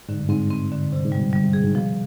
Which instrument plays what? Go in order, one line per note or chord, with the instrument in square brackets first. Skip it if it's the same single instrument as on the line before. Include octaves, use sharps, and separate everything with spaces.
[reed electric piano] G#2 [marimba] D3
[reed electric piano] G2
[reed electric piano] G#2 [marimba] C4
[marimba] C4
D3
[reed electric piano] G2 [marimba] C3
[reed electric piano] G#2
[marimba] G3
[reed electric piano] B2
[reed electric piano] D3 [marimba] G3
[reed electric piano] C3
[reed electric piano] G2 [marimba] G#4
[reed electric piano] G#2
[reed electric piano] B2 [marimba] F3